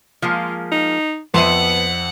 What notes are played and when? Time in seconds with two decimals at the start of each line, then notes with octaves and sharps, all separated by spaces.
0.22 F3 G#3 A#3 F4
0.72 D#4
1.34 F2 B3 C5 E5 F#5 D#7